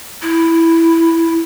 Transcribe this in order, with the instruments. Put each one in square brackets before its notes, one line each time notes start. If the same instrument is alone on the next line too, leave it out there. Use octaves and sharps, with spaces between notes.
[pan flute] E4